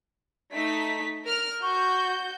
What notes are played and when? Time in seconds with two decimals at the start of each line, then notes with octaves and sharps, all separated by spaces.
0.53 A3 D#4 B6
1.25 A#4 F6
1.63 F#4 C#6 G6